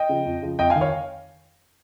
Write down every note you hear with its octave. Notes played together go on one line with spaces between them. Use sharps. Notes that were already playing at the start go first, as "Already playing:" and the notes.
Already playing: D#5 G5
C#3 F3
F2
C#3 F3
F2 D#5 G5
F5 G#5
D#3
C#5 F5